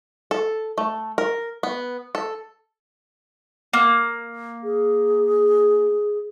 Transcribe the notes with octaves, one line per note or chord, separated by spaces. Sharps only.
A4
A3
A#4
B3
A4
A#3
G#4